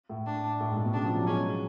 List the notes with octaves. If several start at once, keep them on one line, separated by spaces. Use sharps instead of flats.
A2
D4
A2
G#2
A2
B2
C#3 D4
F3
F#3
G#3 C#4
F#3